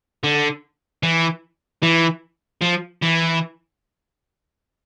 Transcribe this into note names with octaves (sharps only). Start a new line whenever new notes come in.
D3
E3
E3
F3
E3